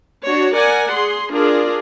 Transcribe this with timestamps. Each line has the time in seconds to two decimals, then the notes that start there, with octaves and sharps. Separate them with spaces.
0.25 D4 F#4 C#5
0.55 A#4 D5 F#5 G#5
0.92 G#4 C6
1.31 D4 F4 G#4 A#4 D5